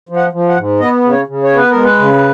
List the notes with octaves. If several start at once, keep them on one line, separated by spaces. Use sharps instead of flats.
F3
F#5
F3
F#5
G#2
B3 D#5
C#3
C#5
C#3
C#5
B3
B4
G#3 A#4
B4
C#3